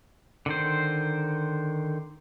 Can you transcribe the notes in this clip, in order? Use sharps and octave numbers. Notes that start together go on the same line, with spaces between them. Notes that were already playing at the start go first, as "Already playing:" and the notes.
D3 D#3 C5